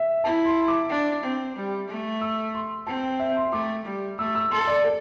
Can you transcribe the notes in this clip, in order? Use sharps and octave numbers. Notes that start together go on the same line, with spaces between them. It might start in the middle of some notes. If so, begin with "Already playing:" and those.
Already playing: E5
E4 A5
C6
D6
D4
C4
G3
A3
E6
C6
C4 A5
G5
E5
C6
A3 D6
G3
A3 E6
E6
A4 C6
D5
A4